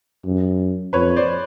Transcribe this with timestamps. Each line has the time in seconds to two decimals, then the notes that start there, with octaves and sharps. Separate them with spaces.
0.25 F#2
0.93 F2 B4 C#5
1.16 C5 D5